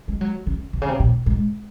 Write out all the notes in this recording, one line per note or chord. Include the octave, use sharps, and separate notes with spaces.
G#3
F#3
C#3
C3
C#3
C3
A#2
G#2